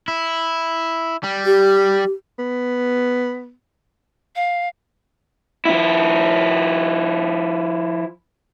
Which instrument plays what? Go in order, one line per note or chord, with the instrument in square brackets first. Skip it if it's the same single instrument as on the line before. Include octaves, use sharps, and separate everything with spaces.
[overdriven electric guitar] E4
G3
[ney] G4
[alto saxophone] B3
[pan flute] F5
[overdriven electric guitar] F3 E4